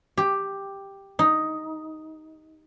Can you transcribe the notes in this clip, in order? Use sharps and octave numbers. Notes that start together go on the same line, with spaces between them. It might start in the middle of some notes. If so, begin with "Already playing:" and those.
G4
D#4